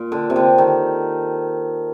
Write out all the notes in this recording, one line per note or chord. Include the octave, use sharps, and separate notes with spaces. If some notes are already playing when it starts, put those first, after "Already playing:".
Already playing: A#2
D3
C3
D3
D#3